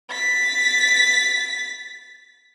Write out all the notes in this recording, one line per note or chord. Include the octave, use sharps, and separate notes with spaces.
A6 B6